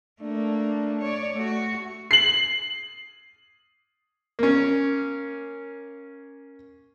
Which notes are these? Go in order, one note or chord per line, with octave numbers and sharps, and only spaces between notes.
A3 A#3 D4
C#5 D5
A3 F#4
C7 F#7
A#3 C#4